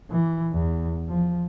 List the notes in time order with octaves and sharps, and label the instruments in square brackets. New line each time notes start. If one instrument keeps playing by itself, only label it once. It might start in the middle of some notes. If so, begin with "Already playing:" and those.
[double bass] E3
E2
F3